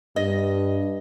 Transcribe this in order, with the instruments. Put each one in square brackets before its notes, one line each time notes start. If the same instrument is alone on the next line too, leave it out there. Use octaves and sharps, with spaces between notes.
[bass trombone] G2 [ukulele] D#5